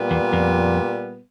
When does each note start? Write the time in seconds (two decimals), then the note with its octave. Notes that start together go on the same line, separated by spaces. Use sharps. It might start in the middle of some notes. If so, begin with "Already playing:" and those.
Already playing: A#2 G3 B3
0.11 E2
0.33 F2